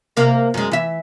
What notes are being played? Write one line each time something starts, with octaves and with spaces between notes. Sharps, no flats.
C3 A#3
F#2 G#3
E3 E5